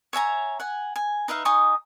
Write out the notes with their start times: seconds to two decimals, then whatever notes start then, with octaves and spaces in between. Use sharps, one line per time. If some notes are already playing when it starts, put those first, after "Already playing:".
0.13 C#5 E5 G#5 A#5
0.60 F#5 G#5
0.96 G#5
1.28 D#4 B4 E5 F5
1.45 D#4 G#5 C#6 D#6